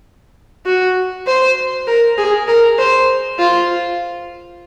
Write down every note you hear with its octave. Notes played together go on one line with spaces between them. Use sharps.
F#4
C5
A#4
G#4
A#4
C5
F4